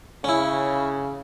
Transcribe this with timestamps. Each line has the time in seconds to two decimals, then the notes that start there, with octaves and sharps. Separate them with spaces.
0.24 C#3 C#4 E4